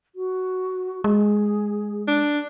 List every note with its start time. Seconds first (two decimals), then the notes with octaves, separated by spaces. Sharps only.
0.15 F#4
1.04 G#3 G#4
2.08 D4